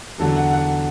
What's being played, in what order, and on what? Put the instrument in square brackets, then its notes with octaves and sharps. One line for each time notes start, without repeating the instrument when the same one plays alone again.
[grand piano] E2 D3 F#3 A4
F#5
F#5